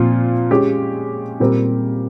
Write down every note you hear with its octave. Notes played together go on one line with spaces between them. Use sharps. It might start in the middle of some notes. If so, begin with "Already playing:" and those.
Already playing: A#2 F3 C4 F4
G#3 C#4 G4
A#2 G3 C4 G4 A#4